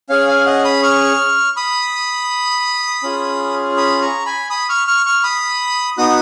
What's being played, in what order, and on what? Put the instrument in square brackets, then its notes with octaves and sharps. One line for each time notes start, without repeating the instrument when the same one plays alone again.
[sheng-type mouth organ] C#4 G#4 C#5 F5
F5 G#5
D#5 F#5
B5 D#6
C#6 F6
B5 D#6
C#4 F4 G#4
B5 D#6
A#5 C#6
G#5 B5
B5 D#6
C#6 F6
C#6 F6
C#6 F6
B5 D#6
B3 D#4 F#4 D#6 F#6